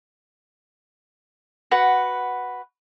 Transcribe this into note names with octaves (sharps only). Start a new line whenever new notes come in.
F#4 B4 F#5